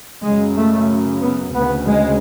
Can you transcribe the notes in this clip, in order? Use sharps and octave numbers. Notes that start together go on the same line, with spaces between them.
F#2 C#3 G#3
A3
B3
D2 C#3 B3
G#3